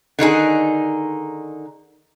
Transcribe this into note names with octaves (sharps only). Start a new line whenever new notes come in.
D3 D#3 D#4 G#4